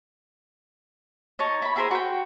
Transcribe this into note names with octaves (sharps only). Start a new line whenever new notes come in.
D#4 C#5 A5
E4 B5
E4 G#4 A#4 C5
F#4 G5